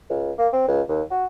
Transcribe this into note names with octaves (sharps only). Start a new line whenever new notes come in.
C#2
A#3
C4
C#2
D#2
F#4